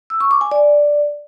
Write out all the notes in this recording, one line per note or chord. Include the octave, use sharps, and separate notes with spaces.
E6
C#6
D6
G#5
D5